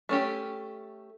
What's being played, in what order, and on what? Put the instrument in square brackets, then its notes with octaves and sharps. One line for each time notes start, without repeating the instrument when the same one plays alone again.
[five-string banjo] A3 C#4 G4